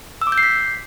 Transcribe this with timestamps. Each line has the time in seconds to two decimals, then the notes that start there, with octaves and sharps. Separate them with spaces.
0.22 E6
0.27 D6
0.32 G6
0.38 C7
0.43 B6